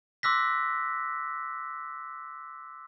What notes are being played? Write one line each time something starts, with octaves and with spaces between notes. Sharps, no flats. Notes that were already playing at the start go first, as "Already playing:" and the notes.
C6 D6 E6 F#6 A#6 B6